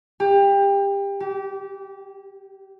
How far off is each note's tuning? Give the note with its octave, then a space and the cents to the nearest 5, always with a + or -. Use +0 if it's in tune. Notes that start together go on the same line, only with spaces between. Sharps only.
G4 +25
G4 -25